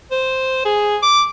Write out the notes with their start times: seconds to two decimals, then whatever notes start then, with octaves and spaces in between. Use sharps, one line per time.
0.11 C5
0.65 G#4
1.03 D6